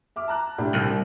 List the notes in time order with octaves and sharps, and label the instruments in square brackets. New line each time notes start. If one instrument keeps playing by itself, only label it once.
[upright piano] E5 D6 F6
A5 A#5 F#6
A2 D4 G4
[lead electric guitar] C2